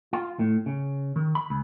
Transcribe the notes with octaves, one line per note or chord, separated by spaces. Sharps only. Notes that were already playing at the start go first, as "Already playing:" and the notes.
F4
A2
C#3
D#3
B5
C#2